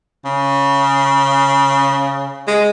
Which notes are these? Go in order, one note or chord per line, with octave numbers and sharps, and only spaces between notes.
C#3
G#3